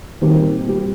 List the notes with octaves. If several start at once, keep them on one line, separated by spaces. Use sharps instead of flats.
A#2 D#3 G3 C4 G4
A#2 G3 C4 G4